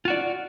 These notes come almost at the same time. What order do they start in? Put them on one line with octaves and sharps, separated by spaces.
F4 F#4 D5